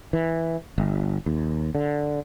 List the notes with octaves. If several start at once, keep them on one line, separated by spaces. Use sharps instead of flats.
E3
G1
D#2
D3